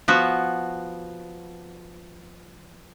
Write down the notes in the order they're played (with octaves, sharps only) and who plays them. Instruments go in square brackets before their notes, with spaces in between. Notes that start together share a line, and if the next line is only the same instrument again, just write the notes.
[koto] F3 B3 F#4